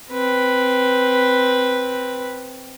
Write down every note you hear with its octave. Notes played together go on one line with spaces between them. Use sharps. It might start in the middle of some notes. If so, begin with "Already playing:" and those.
C4 B4